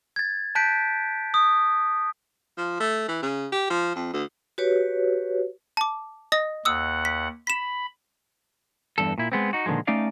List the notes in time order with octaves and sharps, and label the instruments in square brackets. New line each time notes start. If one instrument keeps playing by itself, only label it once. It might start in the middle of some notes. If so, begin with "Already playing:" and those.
[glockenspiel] G#6 A6
A5 F#6 G6 B6 D7
D#6
[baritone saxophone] F3
A3
E3
C#3
G4
F3
F2
D2
[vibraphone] F#4 G4 B4 C#5
[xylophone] A5 D6
D#5 D#6 A#6
[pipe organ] D#2 F#5 [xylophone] D#6 E6
[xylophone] B6
[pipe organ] B5 [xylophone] B6 E7
[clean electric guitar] E2 G2 A4
A#2 E4
G#3 B3 C4
D#4 F#4
A#2 D3 D#3 F3 G#3
A3 C#4 D#4 D5 F5